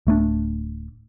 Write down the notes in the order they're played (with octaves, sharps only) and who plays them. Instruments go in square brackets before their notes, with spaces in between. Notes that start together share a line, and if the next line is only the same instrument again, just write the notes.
[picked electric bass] D1 A3 A#3 D4